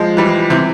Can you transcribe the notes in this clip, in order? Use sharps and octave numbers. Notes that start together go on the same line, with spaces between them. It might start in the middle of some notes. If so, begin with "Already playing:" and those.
Already playing: F3 G#3
E3 G3
C3 E3